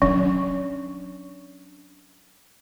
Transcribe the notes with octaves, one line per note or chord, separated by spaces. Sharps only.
F#3 C#4 D4